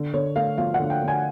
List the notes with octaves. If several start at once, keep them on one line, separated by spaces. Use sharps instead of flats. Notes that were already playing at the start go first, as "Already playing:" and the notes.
Already playing: D3
D3 C#5
A3 F5
F3 F5
F#5
D3
G5
D3
G#5